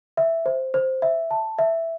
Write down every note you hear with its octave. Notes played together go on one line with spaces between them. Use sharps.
E5
C5
C5
E5
A5
E5